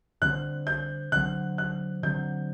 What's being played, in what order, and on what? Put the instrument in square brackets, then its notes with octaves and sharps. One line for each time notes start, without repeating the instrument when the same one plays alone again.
[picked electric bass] D3 G3 C4 [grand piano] F#6
[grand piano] G6
[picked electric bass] D3 F#3 C4 [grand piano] F#6
[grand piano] F#6
[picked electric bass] D3 F#3 C4 [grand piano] G6